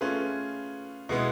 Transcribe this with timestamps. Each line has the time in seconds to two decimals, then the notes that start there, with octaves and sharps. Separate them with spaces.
0.01 A3 C#4 F4 G#4 B4
1.09 B2 G#3 B3 E4